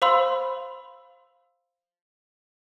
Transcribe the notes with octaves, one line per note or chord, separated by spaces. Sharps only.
C5 F5 B5 C6 E6